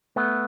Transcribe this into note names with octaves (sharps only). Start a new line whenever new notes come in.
A3 B3